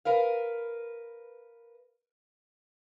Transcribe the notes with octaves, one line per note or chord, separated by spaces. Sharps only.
A#4 B4 F5